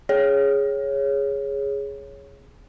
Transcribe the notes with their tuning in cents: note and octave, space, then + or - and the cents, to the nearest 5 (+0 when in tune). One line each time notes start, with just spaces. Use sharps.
G#4 +0 C#5 +0